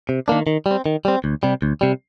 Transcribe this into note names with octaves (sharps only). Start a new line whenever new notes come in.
C3
D#3 A#3 D4
D#3
G3
C4
D#3
G3 C4
D2
C3 G3
D2
C3 G3